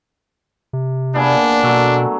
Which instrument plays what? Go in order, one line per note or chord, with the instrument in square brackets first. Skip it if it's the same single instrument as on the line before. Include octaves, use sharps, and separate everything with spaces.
[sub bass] C3
[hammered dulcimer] A#2 B3 G#4 [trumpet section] D4
[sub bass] B2 [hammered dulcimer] D3 F#3 A3